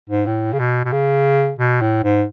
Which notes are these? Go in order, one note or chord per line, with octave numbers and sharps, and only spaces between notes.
G#2
A2
C#3
B2
B2
C#3
B2
A2
G#2